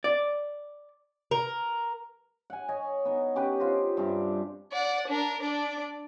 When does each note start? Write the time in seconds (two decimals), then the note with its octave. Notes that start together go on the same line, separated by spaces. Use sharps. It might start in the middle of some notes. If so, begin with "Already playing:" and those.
0.04 D5
1.31 A#4
2.50 F#5 G#5
2.69 C#5 D#5 G#5
3.05 B3 D#4
3.35 C#4 G4 B4
3.60 F4 C5 D#5
3.97 G2 C3 D4
4.73 D5 F#5
5.08 D4 A#4
5.40 D4 D5